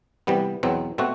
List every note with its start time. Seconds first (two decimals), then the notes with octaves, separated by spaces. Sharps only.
0.27 C3 E3 G3 B3
0.63 E2 B2 F#3 C4
0.98 B2 A3 C4 F#4